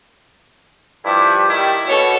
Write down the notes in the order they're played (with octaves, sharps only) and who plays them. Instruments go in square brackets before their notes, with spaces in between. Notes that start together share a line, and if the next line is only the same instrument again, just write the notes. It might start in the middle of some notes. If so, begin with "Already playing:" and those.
[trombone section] G2 F3 G4 [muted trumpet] E4
[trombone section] D#3 G3 [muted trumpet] E4
[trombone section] B2 [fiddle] A4 C#5